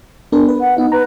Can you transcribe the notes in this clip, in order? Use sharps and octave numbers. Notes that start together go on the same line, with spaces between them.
B3 D4 A#4
B4
F#5
B3 D#4
B4 A#5